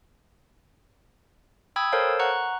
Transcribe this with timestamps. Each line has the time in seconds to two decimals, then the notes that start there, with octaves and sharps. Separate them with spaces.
1.76 G5 B5 D#6 E6 G#6
1.92 A4 A#4 C5 C#5 F5 A5
2.19 F#5 A#5 C#6 F#6